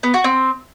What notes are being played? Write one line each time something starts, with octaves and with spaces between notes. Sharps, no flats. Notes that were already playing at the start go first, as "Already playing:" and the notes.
B3
F#4
C4